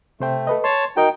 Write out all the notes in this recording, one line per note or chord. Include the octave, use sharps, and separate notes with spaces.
C3 A3 C5 G5
A4 B4 D#5
C#5 A5 C6
D#4 F#4 A#4 D#5 G5